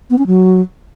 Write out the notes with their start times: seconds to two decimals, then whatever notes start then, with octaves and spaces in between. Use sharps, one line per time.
0.10 B3
0.18 C#4
0.27 F#3